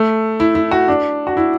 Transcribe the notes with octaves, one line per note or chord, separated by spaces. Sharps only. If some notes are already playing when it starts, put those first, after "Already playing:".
Already playing: A3
E4
E4
F#4
D4
F#4
E4